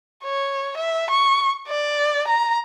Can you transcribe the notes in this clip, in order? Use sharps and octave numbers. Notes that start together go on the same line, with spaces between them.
C#5
E5
C#6
D5
A#5